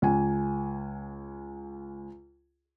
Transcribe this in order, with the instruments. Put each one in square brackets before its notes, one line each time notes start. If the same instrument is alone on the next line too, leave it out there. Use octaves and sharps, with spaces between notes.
[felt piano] C#2 G#5